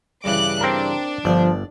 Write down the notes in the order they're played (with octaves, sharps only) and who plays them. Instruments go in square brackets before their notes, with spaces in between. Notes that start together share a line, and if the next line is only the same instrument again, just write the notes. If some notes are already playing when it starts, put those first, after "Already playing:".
[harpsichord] G2 C#3 E3 [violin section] D6 F#6
[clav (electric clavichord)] C4 A#4 [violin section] D4
[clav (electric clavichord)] G1 [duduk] F3 [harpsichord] D5